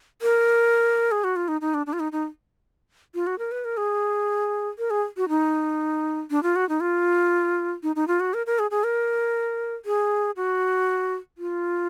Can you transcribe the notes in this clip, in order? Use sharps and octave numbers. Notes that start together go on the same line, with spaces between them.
A#4
G#4
F#4
F4
D#4
D#4
D4
D4
F4
D#4
D#4
F4
F#4
A#4
B4
A#4
G#4
A#4
G#4
F#4
D#4
D4
F4
F#4
D#4
F4
D#4
D#4
F4
F#4
A#4
A#4
G#4
G#4
A#4
G#4
F#4
F4